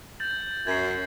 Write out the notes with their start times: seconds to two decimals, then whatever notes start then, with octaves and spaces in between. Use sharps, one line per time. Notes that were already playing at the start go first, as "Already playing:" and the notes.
0.20 G6 A6 F#7
0.67 F#2 G#6 C7